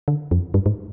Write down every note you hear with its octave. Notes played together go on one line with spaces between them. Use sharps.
D3
F2
G2
G#2